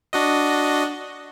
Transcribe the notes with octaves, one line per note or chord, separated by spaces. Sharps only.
D4 F#4 D#5